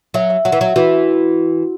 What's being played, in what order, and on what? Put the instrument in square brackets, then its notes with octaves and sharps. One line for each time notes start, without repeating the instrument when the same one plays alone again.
[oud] F#3 [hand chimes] E5
[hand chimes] E5
[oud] F#3 [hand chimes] F#5
[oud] E3
[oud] F#3 [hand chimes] E5
[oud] E3 [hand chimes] F#4